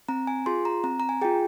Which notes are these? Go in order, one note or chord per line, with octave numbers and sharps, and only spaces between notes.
C4 A#5
G#5
F4 G#4 C6
A#5
C4 A#5
A#5
G#5
F4 G#4 G5